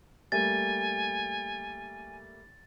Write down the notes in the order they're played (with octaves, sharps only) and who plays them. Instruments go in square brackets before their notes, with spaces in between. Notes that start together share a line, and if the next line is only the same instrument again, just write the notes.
[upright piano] G3 A3 A#3 [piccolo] G#5 [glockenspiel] A6